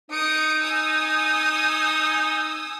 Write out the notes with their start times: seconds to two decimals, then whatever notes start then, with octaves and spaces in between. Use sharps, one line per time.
0.11 D#4 D#6 C#7 D7
0.60 G#5 D#6 E6